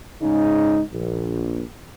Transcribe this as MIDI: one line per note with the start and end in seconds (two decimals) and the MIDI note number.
0.22 0.81 44
0.22 0.81 49
0.22 0.81 63
0.91 1.62 34